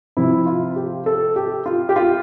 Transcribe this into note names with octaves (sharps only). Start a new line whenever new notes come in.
C3 F3 E4
F4
G4
A4
G4
F4
G4
F4